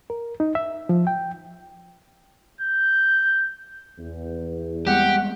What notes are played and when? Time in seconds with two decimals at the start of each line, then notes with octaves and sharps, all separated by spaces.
0.10 A#4
0.40 D#4
0.55 E5
0.89 F3
1.07 G5
2.61 G6
3.99 E2
4.87 G3 G#3 B3 G4 F#5